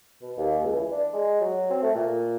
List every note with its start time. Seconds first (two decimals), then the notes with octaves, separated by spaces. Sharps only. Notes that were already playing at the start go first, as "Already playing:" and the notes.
0.22 B2
0.37 D#2
0.63 C#2
0.75 E3
0.91 D4
1.13 G#3
1.41 F#3
1.70 C4
1.82 A3
1.95 A#2